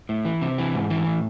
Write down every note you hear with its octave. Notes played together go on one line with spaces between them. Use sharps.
A2
E3
C3
E3
G#2
E3
A2